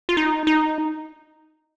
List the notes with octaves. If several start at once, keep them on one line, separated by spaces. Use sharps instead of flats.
F4
D#4
D#4